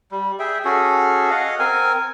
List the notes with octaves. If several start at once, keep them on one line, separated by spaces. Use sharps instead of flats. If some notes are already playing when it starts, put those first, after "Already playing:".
G3
G#4 E5 G5
C#4 F#4 G#4 A4
D#5 F5 F#5
C4 A#4 G#5